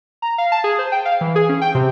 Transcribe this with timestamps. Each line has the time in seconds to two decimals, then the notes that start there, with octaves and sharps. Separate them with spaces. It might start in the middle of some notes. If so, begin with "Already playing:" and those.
0.22 A#5
0.38 F5
0.52 A5
0.64 G#4
0.79 C5
0.92 G5
1.05 F5
1.21 E3
1.35 G#4
1.49 C#4
1.61 G5
1.75 C3